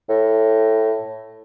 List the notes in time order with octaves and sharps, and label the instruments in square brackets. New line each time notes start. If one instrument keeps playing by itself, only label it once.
[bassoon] A2